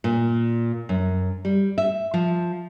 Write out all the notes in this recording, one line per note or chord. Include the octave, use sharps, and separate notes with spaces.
A#2
F#2
G3
E5
F3